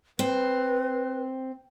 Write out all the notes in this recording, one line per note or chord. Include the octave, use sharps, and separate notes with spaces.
C4 B4